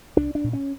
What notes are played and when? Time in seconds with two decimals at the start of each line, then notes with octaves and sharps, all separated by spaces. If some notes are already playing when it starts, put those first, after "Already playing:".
0.17 C2 D4
0.35 D4
0.44 A#2
0.53 C#4